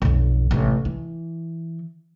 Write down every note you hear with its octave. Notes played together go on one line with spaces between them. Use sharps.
B1 F2
A1 C3
E3